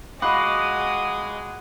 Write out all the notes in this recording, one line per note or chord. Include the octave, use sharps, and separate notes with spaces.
G#3 F#4 F5 B5 D6 D#6